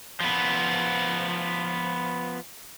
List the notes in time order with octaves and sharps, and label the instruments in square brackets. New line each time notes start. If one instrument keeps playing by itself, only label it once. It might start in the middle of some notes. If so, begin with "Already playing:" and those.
[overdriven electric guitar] F3 B3